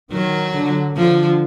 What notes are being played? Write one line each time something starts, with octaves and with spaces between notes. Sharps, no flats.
D#3 F#3
D3
D3 F3